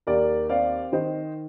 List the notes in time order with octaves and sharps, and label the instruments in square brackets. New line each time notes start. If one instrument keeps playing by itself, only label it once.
[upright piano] D#2 A#4 D5
C4 D5 F5
D#3 C5 D#5